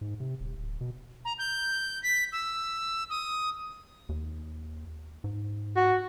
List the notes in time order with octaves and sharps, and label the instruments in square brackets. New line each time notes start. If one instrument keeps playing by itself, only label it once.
[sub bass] G#2
C3
D#1
D1
B2
[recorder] A#5
G6
B6
E6
D#6
[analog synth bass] D#2
G#2
[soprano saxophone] F#4